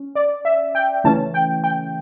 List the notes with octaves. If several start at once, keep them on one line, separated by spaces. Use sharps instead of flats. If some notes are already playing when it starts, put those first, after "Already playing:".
Already playing: C#4
D5
E5
G5
C#3 E3 A3 C#4 A5
G5
G5